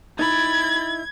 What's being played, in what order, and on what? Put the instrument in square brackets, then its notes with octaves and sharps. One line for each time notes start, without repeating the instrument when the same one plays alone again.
[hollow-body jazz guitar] D#4 E4 [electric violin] B5 A6 [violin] G#6